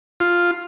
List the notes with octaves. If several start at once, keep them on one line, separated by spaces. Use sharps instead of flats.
F4